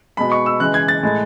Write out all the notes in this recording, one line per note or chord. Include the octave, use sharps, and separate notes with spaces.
B2 G#3 B5
C#6
E6
C#3 E3 G#3 F#6
G#6
A6
A2 G#3